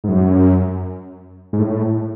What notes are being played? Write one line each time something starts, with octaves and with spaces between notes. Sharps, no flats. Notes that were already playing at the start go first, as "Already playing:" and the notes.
G#2
F#2
G#2
A2